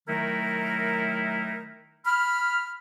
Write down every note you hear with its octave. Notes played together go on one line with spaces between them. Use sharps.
D#3 F#3 A3 D#4 E4 A#4
B5 F6